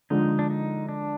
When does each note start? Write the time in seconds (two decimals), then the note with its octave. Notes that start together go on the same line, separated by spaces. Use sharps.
0.10 D3 F3 G#3 D#4
0.39 D4
0.50 D#4
0.89 D4